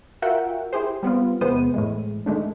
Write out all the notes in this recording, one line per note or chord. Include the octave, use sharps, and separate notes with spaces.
F4 F#4 A#4 E5 F#5 G5
E4 G4 G#4 C5
G3 B3 C4 F4
E2 C3 G#3 B3 C5 D#7
A2 E3 G#3
D#3 G#3 A3 D4